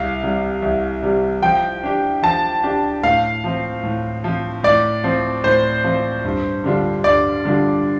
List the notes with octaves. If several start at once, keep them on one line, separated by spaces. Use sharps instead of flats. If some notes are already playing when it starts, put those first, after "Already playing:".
Already playing: C2 F5
C3 G3
C2
C3 G3
F3 G5
D4 G4
F3 A5
D4 G4
A2 F5
F3 C4
A2
F3 C4
A2 D5
F3 C4
A2 C5
F3 C4
G2
D3 G3 D4 F4
G2 D5
D3 G3 D4 F4